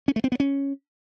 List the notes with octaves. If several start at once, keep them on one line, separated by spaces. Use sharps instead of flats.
C#4
A3
C4
B3
C#4